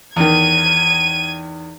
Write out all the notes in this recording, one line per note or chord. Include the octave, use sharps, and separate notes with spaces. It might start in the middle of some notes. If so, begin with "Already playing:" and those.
E2 D#3 G#6 D#7